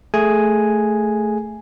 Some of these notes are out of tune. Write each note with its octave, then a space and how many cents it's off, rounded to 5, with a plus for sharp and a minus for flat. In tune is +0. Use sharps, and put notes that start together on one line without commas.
A3 +0 G#4 +0 G#5 +0